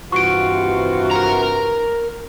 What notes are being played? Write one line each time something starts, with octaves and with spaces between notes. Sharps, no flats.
G2 C3 E3 F4 F#4 C#6 D7
A#4 A#5